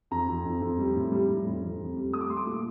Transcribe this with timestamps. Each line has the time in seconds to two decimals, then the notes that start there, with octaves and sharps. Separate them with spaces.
0.11 F2 A#5
0.28 F2
0.45 F2
0.62 F2
0.79 G3
0.95 A2
1.12 G3
1.28 A2
1.46 F2
1.62 F2
1.79 F2
1.97 G3
2.13 A3 D#6
2.21 D6
2.29 A3 C6
2.37 D6
2.47 A#2